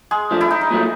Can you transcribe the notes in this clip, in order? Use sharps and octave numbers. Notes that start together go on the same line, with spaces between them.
G#3 G#4
F3 A3 D4
E4
D#4
D#4
A#2 F#3 A3